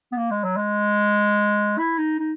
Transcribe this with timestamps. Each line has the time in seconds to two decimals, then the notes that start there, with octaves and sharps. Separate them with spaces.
0.12 B3
0.17 A#3
0.31 G#3
0.44 F#3
0.57 G#3
1.78 E4
1.98 D#4
2.19 D#4